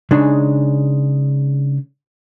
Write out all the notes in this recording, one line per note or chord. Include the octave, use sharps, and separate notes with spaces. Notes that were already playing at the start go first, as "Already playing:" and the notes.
C#3 G#3 D4 D#4 G#4